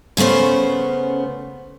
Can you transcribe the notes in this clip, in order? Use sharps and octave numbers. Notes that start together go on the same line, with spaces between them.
C#3 A3 B3 C#4 C5